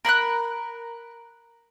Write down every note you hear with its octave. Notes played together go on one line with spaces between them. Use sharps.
A#4 B5 F6 F#6